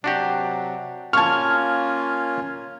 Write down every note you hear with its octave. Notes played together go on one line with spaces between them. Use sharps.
C3 F#3 D4 F#4 G4
A#3 C#4 F4 A5 C#6 F6 G#6